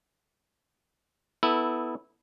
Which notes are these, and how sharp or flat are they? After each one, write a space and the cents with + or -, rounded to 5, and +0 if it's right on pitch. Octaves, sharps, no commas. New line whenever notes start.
B3 +0 E4 -15 A4 +0